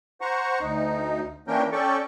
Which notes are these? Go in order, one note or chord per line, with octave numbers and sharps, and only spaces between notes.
C5 F#5 A#5 C#6
D2 D#4
E3 A#3 C#4 D4 A#4 G5
C#4 A4 D5 G5 C#6